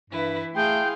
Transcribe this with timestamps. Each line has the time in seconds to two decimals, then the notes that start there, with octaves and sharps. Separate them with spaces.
0.10 G2 E3 E4 B4
0.55 A3 E4 G#4 F5 G5 C6